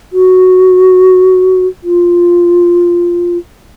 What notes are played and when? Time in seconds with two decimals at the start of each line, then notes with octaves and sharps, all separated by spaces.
0.13 F#4
1.83 F4